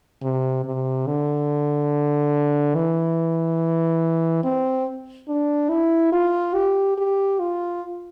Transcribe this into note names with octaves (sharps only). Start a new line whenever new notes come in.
C3
C3
D3
E3
C4
D4
E4
F4
G4
G4
F4